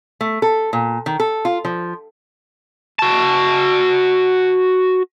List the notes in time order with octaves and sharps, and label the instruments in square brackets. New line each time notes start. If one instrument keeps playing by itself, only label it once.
[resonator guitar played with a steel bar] A3
A4
A#2
D#3
A4
F4
F3
[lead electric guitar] F#4 A5